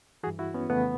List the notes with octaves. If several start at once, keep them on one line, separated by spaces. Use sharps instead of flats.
G2 E3 F#4 G#4
E4 F#4
B3 C#4
F2 C#3 E3 A3 B3